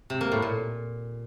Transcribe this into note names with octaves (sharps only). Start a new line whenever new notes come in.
C3
A#3
A2
A#2